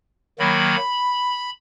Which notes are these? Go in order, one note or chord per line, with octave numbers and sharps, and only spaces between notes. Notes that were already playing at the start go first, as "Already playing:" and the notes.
D#3 F#3 A#3 B5